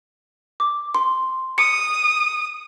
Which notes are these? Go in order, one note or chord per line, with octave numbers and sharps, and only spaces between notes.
D6
C6
D#6 C#7